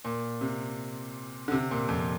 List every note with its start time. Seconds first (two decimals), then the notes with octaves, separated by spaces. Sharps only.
0.05 A#2
0.41 C3
1.48 D3
1.52 C3
1.71 A#2
1.89 F2